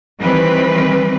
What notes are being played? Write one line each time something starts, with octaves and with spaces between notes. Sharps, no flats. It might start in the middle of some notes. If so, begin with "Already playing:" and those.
D#3 E3 G3 C4 B4